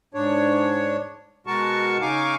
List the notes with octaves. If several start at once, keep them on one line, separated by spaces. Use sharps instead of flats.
G#2 D4 C#5
B2 G#3 F#4 A#4 A5 C#6
C#3 D#4 F5 G#5 C#6 D6